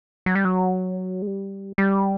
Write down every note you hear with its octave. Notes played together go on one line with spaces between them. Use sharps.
F#3
G3
F#3
G#3
G3
G3